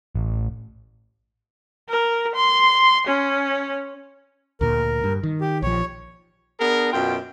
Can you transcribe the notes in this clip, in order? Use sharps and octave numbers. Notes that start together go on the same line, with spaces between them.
A1
A#4
C6
C#4
D2 A#2 A#4
G2
D#3
G4
A#1 F3 C#5
B3 D4 G#4 A#4
F#2 B2 F4 G5